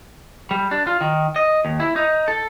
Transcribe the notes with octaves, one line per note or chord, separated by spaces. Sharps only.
G3
D4
F4
D#3
D#5
D#2
E4
D#4
A4